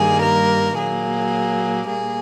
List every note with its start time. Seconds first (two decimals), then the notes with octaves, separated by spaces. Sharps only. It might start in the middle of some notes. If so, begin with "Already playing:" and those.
Already playing: G2 D#3 G3 A#3 G#4
0.23 A#4
0.77 A#2 F#3 A#3 G#4
1.87 A#2 G3 A#3 G#4